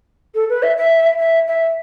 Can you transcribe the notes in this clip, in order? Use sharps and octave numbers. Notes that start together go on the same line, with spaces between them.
A4
B4
E5
E5
E5
E5